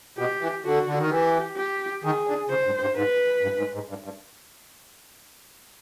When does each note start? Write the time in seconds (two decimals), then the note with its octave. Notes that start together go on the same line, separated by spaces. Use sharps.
0.17 B2 G4
0.41 E3
0.64 D3 F#4
0.86 D3
0.98 D#3
1.10 E3 G4
1.57 G4
2.03 D#3 G#4
2.27 D3
2.49 C#3 C5
2.66 G2
2.81 G2
2.96 G#2 B4
3.43 G2
3.58 G#2
3.74 G#2
3.89 G2
4.04 G2